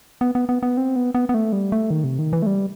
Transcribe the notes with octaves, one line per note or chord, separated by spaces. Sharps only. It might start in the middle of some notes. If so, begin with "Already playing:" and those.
B3
B3
B3
B3
C4
B3
B3
B3
A3
G3
A3
D#3
C3
D#3
E3
A3
G3